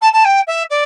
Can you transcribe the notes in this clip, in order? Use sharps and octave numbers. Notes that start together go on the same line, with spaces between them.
A5
A5
G5
E5
D5